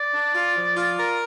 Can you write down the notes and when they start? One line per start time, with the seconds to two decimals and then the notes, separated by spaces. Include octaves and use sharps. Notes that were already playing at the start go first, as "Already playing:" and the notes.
Already playing: D5
0.14 D4
0.35 F4
0.56 F3
0.77 F4
0.99 A#4